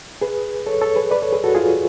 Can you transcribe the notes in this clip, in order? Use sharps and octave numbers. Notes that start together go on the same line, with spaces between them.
G#4 B4
A4 C#5
A4 C#5
G#4 B4
B4 D5
A4 C#5
G#4 B4
F#4 A4
F4 G#4